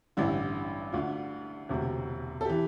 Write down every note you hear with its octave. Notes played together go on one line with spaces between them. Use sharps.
A1 G2 D3 E4
D2 D3 F4
E1 D2 C3
A4
E3 G4